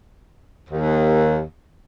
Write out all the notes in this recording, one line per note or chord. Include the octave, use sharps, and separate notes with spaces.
D#2